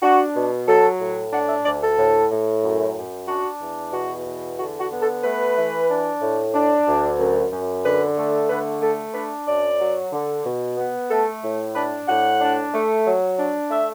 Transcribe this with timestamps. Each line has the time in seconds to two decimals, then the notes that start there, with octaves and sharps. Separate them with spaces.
0.02 D4 F#4
0.35 B2
0.67 F#3 A4
1.00 A2
1.33 D4 F#5
1.49 E5
1.65 D2 D5
1.82 A4
1.98 A2
2.31 A2
2.63 F#2
2.96 F#2
3.28 D4 F#4
3.61 E2
3.93 B2 F#4
4.25 E2
4.58 D3 F#4
4.80 F#4
4.91 B3
5.02 A4
5.24 A3 B4
5.56 E3
5.89 D4
6.21 A2
6.54 D4
6.87 D2
7.19 F#2
7.52 F#2
7.84 D3 B4
8.17 A3
8.49 D3 B4
8.82 A3 A4
9.14 D4 B4
9.47 F#2 D5
9.79 F#3
10.12 D3
10.45 B2
10.77 B3
11.10 A3 A4
11.42 A2
11.74 D4 B4
12.07 A2 F#5
12.41 D4
12.73 A3
13.06 F#3
13.38 D4
13.70 A3 E5